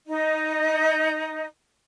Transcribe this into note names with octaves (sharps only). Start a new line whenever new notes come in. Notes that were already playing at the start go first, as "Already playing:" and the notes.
D#4 D#5